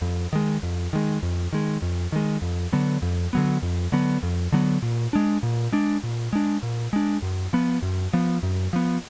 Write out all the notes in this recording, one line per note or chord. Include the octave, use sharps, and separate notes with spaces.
F2
D#3 G#3
F2
D#3 G#3
F2
D#3 G#3
F2
D#3 G#3
F2
D3 F#3 B3
F2
D3 F#3 B3
F2
D3 F#3 B3
F2
D3 F#3 B3
A#2
G#3 D4
A#2
G#3 D4
A#2
G#3 D4
A#2
G#3 D4
F#2
F3 B3
F#2
F3 B3
F#2
F3 B3